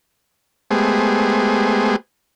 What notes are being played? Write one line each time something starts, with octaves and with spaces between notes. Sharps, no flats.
G#3 A3 B3 G4 G#4 C5